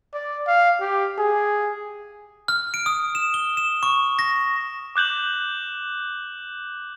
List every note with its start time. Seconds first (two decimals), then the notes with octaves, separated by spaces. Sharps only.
0.14 D5
0.47 F5
0.80 G4
1.18 G#4
2.48 F6
2.74 D7
2.86 D#6
3.15 E7
3.34 G7
3.57 E7
3.83 C#6
4.19 A#6
4.96 D6 F#6 G6 F#7